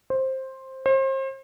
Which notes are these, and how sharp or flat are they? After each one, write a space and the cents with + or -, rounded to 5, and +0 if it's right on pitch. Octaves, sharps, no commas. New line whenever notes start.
C5 +10
C5 +35